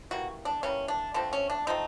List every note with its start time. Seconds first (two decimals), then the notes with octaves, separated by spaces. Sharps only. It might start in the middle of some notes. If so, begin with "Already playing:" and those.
0.11 E3 G3 A#3 F#4
0.45 D4
0.63 E3 G3 A#3 C#4
0.88 D4
1.14 D3 F3 A3 C4 D4
1.33 C#4
1.50 D4
1.67 D3 F3 A3 C4 D#4